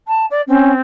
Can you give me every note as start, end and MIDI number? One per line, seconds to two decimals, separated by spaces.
0.08 0.26 81
0.30 0.41 74
0.48 0.81 60
0.48 0.72 61